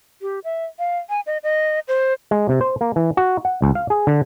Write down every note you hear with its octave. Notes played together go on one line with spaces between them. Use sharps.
G4
E5
F5
G#5
D#5
D#5
C5
G#3
C3
C5
A#3
E3
F#4
F#5
C#2
F5
G#4
D3